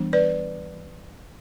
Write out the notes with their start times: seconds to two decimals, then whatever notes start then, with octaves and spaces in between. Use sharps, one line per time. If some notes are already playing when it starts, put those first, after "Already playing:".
Already playing: E3 G3 B3 D4
0.13 B4 D5